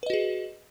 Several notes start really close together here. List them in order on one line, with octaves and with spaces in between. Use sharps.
B4 D#5 F#4 G#4